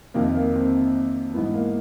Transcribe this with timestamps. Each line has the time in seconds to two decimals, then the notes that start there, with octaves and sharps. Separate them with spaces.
0.14 F2 C3 D#3 A#3
0.35 A#3
0.55 C4
1.34 G#2 E3 B3
1.54 A#3